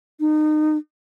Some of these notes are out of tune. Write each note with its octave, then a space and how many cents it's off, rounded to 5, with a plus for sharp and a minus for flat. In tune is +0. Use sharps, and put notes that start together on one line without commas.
D#4 -25